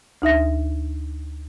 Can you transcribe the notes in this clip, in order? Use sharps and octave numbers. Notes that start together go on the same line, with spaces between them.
D2 D#4 E5 A#6